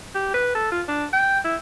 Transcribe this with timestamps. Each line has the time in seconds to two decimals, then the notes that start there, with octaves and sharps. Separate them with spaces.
0.15 G4
0.34 B4
0.55 A4
0.72 F4
0.88 D4
1.13 G5
1.45 E4